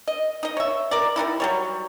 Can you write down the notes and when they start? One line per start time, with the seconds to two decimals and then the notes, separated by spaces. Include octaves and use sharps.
0.08 D#5
0.43 D#4 D#5
0.57 C#5 E5
0.91 A#4 D5
1.16 G3 B3 D#4 E4
1.40 F#3 G3 C#5